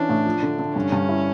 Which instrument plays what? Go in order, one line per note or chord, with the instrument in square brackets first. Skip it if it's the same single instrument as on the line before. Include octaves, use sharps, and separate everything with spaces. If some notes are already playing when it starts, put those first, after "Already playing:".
Already playing: [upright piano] E3 C#4 [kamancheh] D4
[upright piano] A2
F3
D3
D3
[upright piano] G2 [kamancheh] C#4
[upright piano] G2
E4